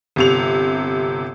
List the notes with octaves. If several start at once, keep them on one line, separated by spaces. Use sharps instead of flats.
G1 C3 F7